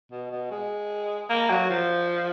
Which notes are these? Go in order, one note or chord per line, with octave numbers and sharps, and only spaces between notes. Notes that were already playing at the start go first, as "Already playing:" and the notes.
B2
B2
G#3
A#3
F#3
F3